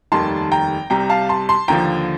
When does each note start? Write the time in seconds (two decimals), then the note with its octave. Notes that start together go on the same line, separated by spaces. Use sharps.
0.12 F1 D#2 D#3 G3 A5 C6
0.52 G5 A#5
0.90 C2 C3 G3 G5 A#5
1.10 F5 A5
1.29 A5 C6
1.49 A5 C6
1.68 D#2 D3 F3 G5 A#5